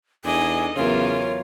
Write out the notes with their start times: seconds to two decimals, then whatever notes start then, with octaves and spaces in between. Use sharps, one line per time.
0.25 E2 D4 D#4 G#4 A4 D#5 G#5
0.76 E2 C#3 E3 F#3 F4 A#4 C#5